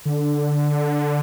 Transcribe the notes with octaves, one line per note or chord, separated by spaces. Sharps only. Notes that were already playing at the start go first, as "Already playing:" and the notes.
D3